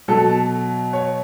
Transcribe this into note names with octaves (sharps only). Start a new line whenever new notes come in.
B2 F#3 A4
C#5